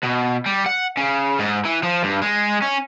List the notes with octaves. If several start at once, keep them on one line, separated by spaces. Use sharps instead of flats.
B2
G3
F#5
C#3
G#2
E3
F3
G2
G#3
C#4